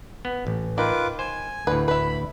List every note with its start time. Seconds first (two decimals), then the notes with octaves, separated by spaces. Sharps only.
0.25 B3
0.47 A1
0.78 D#3 F4 B4 D6
1.19 C5 G#5
1.67 D2 A2 B4
1.88 E4 B4 B5